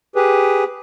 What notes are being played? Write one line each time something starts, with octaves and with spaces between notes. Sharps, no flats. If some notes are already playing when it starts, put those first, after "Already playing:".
G4 G#4 B4